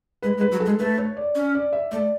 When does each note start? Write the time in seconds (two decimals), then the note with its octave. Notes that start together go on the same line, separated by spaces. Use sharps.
0.22 G#3 B4
0.37 G#3
0.41 B4
0.52 F#3
0.60 A4
0.66 G#3
0.79 A3 B4
0.98 C#5
1.17 D5
1.35 C#4
1.55 D5
1.73 E5
1.92 A3 D5